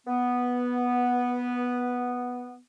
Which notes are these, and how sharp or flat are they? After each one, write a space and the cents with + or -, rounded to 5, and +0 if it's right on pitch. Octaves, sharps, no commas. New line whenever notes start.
B3 -5